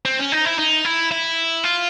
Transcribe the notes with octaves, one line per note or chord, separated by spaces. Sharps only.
C4
C#4
D#4
E4
D#4
E4
E4
F4